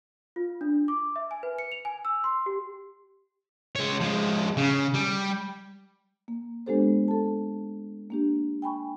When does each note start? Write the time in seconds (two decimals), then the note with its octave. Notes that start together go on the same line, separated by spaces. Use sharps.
0.36 F4
0.61 D4
0.88 D6
1.16 E5
1.31 G#5
1.43 B4
1.59 C#7
1.72 F7
1.85 G#5
2.05 E6
2.24 C6
2.46 G4
3.76 G#3 C#5
4.00 F3 G#3
4.57 C#3
4.94 G3
6.28 A#3
6.66 G#3 B3 D4 G4 A4 C5
7.08 A4 A5
8.10 A#3 D4 G4
8.62 G5 G#5 B5 C#6